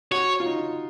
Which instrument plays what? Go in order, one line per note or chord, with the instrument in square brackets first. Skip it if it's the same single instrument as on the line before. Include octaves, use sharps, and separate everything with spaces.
[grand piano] F#4 [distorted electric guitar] C#5
[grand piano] F4
D#4